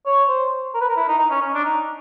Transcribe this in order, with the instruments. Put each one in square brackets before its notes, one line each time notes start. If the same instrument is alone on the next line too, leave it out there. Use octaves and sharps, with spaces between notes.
[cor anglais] C#5
C5
A#4
B4
A#4
E4
D#4
D#4
C#4
C#4
D4
D#4